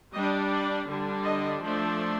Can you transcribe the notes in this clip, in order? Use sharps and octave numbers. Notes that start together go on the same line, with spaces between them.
G3 D4 D#5
D5
D3 G3 D4
D#5
F3 A3 D4